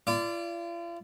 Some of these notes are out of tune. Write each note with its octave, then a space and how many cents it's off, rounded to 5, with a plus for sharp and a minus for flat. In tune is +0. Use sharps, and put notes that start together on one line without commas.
F4 -40 D5 -10